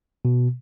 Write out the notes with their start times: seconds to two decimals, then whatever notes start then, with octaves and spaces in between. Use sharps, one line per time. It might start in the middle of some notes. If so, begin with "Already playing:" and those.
0.25 B2